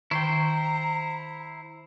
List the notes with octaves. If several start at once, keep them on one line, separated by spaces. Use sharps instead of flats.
D#3 E4 C5 G5 A#5